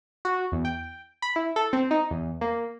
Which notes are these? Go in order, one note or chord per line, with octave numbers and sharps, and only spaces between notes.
F#4
E2
G5
B5
E4
A4
C4
D#4
E2
A#3